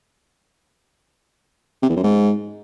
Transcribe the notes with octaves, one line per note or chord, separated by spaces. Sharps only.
C3
E2
F#2
G#2